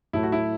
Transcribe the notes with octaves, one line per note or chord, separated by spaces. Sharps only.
A2 F#3 A3 E4
F#4
E4